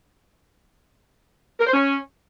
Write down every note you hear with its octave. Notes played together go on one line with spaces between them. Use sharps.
A#4
C5
C#4